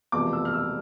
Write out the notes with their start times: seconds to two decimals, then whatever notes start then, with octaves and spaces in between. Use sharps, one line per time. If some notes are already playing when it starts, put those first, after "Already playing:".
0.12 E1 E2 C3 F3 A3 D6
0.33 E6
0.45 F6
0.54 E6